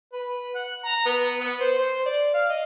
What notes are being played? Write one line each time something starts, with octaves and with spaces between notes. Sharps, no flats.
B4
F#5
A#5
B3
B3
C5
C5
D5
F5
D#5